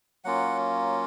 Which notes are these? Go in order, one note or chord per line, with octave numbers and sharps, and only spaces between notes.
F#3 A#3 C#4 F4 F#5